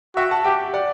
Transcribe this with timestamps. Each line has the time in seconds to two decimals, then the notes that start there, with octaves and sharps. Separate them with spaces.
0.16 F#4 E5 G5
0.31 F#5 A5
0.44 G4 E5 G5
0.74 D5 F#5